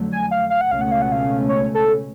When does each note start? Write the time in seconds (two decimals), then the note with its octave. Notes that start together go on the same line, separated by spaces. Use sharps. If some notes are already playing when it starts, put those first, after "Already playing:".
Already playing: F2 D3 F#3 A3
0.12 G#5
0.31 F5
0.50 F5
0.61 F#5
0.70 C#2 B2 A3 C#4 F5
0.81 F#5
0.91 F5
1.02 F#5
1.12 F5
1.49 C#5
1.74 A4